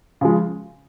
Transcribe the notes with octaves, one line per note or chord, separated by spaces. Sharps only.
C#3 F3 G#3